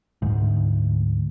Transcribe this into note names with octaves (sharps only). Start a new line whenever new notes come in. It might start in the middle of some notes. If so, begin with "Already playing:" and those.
D2 G#2